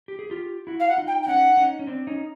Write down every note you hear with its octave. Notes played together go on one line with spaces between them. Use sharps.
G4
G#4
F4 G4
E4 F#4
F5
F#5
D#4 F4
G5
G5
C#4 D#4 F#5
C#4 D#4
C#4
C4 D4
C#4 D#4